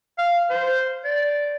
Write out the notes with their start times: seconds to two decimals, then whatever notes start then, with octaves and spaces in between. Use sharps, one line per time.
0.19 F5
0.50 C5
1.05 D5